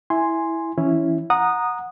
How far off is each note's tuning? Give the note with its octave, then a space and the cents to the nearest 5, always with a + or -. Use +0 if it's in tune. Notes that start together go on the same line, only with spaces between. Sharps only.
E4 -5 G#5 +0 C6 +0
E3 +0 C#4 +0 E4 +0
F#5 -20 A#5 +0 D#6 -15